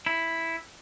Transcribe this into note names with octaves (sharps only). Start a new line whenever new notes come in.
E4